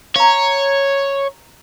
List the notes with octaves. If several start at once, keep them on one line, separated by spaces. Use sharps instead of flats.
C#5 F5 A#5